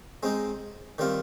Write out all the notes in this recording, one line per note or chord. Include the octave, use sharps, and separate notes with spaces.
G#3 C4 D#4
D#3 G3 C4 F4